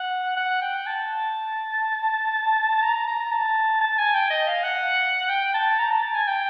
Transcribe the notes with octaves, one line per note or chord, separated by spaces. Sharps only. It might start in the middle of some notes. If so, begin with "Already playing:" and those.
Already playing: F#5
F#5
G5
A5
A#5
A#5
A5
A5
G#5
G5
D#5
F5
F#5
G5
A5
A#5
A5
A5
G#5
G5